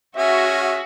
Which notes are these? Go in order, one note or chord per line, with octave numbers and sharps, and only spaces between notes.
C#4 F#4 G#4 E5